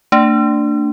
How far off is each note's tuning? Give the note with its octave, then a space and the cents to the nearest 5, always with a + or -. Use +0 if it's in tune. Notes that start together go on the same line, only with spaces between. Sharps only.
A3 +45 D4 +0